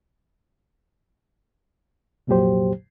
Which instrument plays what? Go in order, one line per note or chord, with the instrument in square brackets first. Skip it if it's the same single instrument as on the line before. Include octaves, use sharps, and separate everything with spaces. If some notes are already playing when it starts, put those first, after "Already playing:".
[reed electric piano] C2 F2 A#2 F#3 G4 C5